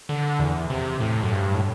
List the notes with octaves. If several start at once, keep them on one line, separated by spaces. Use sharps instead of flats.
D3
E2
C3
A2
F#2
G2
A2